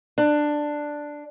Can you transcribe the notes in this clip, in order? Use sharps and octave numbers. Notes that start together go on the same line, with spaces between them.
D4